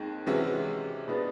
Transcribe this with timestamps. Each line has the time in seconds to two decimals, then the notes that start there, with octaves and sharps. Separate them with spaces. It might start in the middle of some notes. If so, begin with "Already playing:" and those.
Already playing: D#2 D#3 G#3 C4
0.26 C3 E3 G#3 C#4 F#4
1.08 B2 G#3 B3 D4